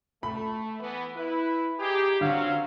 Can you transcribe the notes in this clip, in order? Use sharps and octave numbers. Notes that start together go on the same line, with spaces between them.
A3 B5
E3 B3
E4 B4
D#4 G4 G#4
D3 F#3 C4 C#4 F5